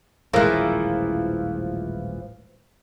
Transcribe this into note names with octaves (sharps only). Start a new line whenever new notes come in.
D#1 A1 E3 F3 G#3 E4 A#4